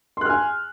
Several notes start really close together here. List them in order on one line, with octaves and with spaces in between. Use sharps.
C6 F#6 F6 G#5